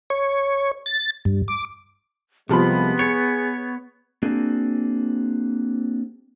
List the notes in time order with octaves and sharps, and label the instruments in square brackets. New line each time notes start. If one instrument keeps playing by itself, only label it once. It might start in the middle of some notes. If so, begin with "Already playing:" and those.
[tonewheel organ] C#5
A6
G2
D6
[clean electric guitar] C2 [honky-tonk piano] C3 F3 B5 [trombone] G#3 [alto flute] B3
[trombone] G#4 [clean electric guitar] C#5 [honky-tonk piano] C#7
[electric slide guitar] A#3 C4 D4 F#4 G#4